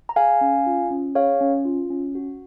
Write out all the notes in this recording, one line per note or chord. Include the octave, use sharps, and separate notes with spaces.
A#5
G#4 F5 G#5
C#4
F4
C#4
G#4 C#5 F5
C#4
F4
C#4
F#4